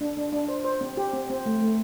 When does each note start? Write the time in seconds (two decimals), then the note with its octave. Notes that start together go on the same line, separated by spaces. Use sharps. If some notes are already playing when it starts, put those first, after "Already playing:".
0.01 D4
0.17 D4
0.32 D4
0.48 C5
0.64 C5
0.81 C4
0.97 G4
1.13 C4
1.30 C4
1.46 A3
1.62 A3